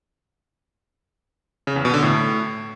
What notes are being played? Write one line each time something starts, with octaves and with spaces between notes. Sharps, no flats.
C#3
E2
B2
D3
A2